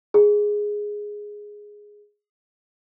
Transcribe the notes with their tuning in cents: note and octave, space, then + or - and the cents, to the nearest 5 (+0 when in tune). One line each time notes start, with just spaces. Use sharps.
G#4 +0